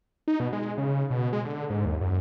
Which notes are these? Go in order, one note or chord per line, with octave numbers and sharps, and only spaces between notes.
D#4
B2
G#3
C#3
C#3
B2
G#3
D3
G#2
D#2
F#2